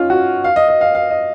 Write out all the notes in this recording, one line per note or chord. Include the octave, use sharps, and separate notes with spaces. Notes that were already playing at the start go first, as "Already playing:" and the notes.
Already playing: C#4 D#4 F4
F#4
F5
D#5
D#5
F5
F5
D#5